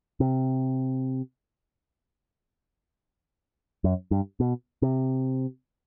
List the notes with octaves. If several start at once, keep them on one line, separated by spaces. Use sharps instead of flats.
C3
F#2
G2
B2
C3